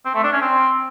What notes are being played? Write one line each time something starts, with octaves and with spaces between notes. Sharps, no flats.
C4
A3
D4
C#4
C4